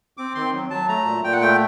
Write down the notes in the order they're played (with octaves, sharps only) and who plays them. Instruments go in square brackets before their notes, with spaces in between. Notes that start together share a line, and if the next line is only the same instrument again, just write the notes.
[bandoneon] C4 D6
D#3 C6
F#3
F#3 A5
A3 A#5
A#2
A#2 G5
F#5
A3 G5